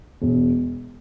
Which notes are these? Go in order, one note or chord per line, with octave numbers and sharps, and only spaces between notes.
E1